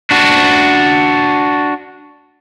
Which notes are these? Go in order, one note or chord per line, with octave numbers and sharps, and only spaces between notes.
D4 F#4